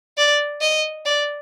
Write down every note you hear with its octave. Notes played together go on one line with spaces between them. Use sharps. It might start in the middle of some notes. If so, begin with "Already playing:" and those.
D5
D#5
D5